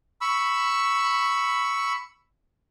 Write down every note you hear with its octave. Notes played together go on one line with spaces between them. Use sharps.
B5 C#6 E6